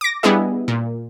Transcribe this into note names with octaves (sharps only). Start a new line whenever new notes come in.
D6 A#6
G3 B3 D4 E4 G#4 D#5
A#2